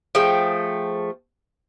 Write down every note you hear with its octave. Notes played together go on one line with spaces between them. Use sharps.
F3 A3 G#4 G5